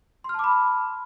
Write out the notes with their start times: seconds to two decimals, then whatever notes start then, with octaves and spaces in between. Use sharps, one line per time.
0.24 C6
0.29 F6
0.34 A5
0.39 D6
0.44 B5